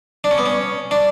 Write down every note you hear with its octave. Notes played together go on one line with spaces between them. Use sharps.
D4
C#4
B3
C#4
D4